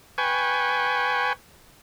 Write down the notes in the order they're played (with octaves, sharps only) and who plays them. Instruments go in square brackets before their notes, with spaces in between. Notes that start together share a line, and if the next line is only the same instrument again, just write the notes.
[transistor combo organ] B4 G5 G#5 C#6